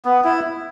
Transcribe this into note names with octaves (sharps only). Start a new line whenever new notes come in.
B3
E4